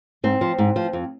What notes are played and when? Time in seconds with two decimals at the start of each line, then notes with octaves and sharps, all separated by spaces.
0.24 G#2 C4
0.41 F3
0.58 G#2
0.76 F3
0.93 F2